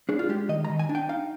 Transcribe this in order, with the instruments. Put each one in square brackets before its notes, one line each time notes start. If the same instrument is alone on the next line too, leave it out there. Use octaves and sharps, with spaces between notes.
[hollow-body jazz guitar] D4 G#4
F4
G#3 G4
D#3 D#5
A#5
D#3
G#5
D4
G5
D#4 F5